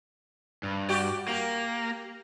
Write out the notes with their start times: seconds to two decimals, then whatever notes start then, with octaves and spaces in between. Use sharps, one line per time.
0.63 G2
0.89 F#4 G4 D5
1.28 A#3 G4 A#4